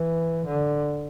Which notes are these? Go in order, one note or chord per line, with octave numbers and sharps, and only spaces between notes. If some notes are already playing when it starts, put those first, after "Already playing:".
Already playing: E3
D3